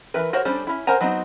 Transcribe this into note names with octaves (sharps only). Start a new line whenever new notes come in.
E3 A#4 B4
F#4 A#4 C5 C#5
G3 C#4 D4 A4 C5
C#4 E4
A#4 C5 F#5 G#5 A#5
F#3 B3 C4 D#4